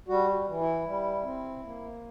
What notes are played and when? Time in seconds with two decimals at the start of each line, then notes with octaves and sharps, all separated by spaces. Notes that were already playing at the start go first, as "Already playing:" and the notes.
0.08 G3 F#4
0.47 E3
0.61 E4
0.86 G3
1.24 C4
1.63 A#3